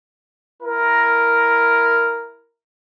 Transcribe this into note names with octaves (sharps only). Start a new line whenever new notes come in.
E4 A#4